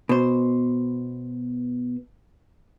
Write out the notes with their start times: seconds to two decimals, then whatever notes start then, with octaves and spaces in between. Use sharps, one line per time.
0.09 B2 C5